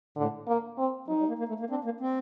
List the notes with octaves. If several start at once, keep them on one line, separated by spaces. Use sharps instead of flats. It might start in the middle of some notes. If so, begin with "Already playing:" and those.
A2 D3
A#3
C4
F#3 D#4
G3
A#3
A#3
A3
A#3
C4 D4
A#3
C4